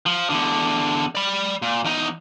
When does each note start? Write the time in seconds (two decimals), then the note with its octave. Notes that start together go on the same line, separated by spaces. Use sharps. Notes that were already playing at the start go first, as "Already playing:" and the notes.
0.06 F3
0.30 E2 D3
1.15 D5 B5
1.62 A#2
1.84 E2 D#4